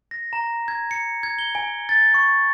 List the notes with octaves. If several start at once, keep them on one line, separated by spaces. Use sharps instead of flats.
A#6
A#5
G#6
C#7
G#6
G7
G#5
A6
C#6